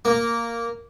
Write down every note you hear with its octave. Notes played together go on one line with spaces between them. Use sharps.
A#3